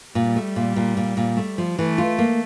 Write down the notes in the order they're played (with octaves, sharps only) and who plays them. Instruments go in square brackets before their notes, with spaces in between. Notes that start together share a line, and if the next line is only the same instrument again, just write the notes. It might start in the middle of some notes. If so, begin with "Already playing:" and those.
[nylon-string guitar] A#2 [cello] G3
[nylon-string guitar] A3
A#2
A#2
A#2
A#2
A3
F3
[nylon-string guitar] E3 [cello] A3
[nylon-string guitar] F4
A#3